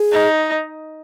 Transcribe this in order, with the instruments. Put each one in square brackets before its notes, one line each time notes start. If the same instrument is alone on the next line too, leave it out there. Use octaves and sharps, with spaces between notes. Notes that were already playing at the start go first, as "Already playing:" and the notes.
Already playing: [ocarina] G#4
[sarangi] D#4